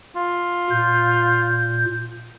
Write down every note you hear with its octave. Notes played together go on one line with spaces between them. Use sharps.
F4
A#2 G6